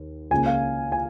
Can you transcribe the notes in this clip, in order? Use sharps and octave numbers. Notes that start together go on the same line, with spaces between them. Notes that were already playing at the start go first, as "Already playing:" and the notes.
Already playing: D#2
C#2 C#3 A#3 G#5
F5
G#5